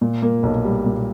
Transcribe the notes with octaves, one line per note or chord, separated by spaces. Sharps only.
A#2
A#3
B1
G3
A#2